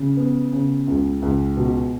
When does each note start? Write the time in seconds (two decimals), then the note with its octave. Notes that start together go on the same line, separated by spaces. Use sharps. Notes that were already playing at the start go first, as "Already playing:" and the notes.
Already playing: C#3
0.17 B3
0.53 C#3
0.87 C#2
1.22 C#2
1.57 B2